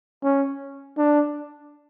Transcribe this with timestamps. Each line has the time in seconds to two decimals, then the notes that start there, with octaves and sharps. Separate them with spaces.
0.23 C#4
0.98 D4